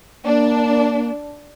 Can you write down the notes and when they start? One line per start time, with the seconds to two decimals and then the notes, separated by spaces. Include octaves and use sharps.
0.25 A#3 D4